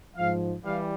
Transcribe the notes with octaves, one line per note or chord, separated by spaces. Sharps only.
G#2 F3 F5
E3 G3 F5